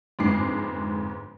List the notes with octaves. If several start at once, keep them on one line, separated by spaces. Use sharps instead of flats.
G1 F2 G#2 G#3 D6 C7